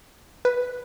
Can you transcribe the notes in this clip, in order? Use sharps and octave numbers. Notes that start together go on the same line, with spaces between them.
B4